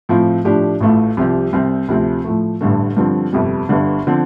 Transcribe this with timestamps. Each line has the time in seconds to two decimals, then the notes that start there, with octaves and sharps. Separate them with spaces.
0.09 A2 F3 C4 F4
0.45 A2 F3 D4 G4
0.81 A1 A2 A3 F4
1.17 C2 C3 F3 C4 G4
1.52 C2 C3 G3 C4
1.88 D2 C3 F3 C4
2.24 A2 F3 A3
2.61 A1 G2 D3 A3
2.97 G2 D3 F3 C4
3.33 G1 F2 C3 G3
3.69 G1 G2 D3
4.07 D3 F3 C4